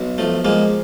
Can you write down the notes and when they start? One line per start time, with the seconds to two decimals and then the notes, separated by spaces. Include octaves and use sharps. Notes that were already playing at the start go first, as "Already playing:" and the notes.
Already playing: B1
0.18 F3 A3
0.45 F3 G#3 A#3